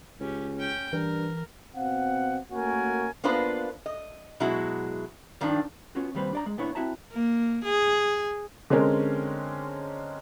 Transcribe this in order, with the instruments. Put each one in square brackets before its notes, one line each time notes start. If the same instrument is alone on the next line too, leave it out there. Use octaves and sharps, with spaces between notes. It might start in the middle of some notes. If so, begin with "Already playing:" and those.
[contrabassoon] C#2 [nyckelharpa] C#4 G4
[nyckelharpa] C#4 G5
[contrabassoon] G2 [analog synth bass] E3 [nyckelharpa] A#4
[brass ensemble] B2 C4 F5 F#5
A3 A#3 C#4 F#4 A#4 G#5
[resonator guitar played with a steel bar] A#3 B3 D4 F4 B4 C5
D#5
B2 F#3 G#3 E4 F#4
G2 D#3 F3 D4
[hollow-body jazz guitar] B3 C#4 F4 F#4
D#2 C3 G3 B4 C5
D4 D5 A#5
G#3
A#2 B3 D4 E4 C#5
C4 E4 F#4 E5 A5 A#5
[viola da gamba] A#3
G#4
[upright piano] D3 G#3 C4 C#4 A#4